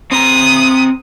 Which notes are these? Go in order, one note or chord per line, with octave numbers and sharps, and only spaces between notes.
C4 A#5 D#6